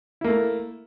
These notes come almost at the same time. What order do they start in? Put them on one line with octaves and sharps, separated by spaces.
E4 A#3 A3